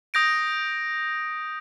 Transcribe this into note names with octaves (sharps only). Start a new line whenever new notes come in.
D#6 G6 A#6 D7